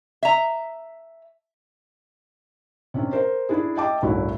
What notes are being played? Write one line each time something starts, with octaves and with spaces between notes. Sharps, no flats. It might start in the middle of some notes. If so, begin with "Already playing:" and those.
E5 A#5
C3 C#4 D4
A#4 C5
D4 E4 G#4
D#5 E5 G5 A5 D6
G1 C2 A2 E4 F#4